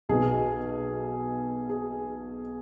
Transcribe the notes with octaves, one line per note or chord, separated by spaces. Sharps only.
B1 B2 G#4
G#4